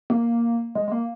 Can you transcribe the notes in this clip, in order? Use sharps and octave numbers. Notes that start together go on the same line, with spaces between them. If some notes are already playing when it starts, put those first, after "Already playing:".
A#3
G#3
G#3
A#3